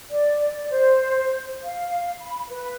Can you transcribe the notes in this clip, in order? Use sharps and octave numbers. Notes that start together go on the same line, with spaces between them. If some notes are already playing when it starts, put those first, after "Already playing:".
D5
C5
F5
B5
B4